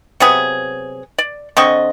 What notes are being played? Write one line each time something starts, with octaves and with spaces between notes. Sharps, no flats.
C3 F#3 B3 G#4
D5
D3 C4 D#5 C#6